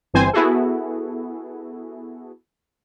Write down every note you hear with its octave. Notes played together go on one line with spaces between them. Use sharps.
G1 G2 E3 C4 C5 G#5
B3 E4 F#4 G#4 A4